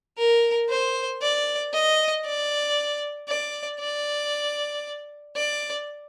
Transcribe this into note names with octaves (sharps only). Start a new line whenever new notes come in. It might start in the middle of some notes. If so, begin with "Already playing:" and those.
A#4
C5
D5
D#5
D5
D5
D5
D5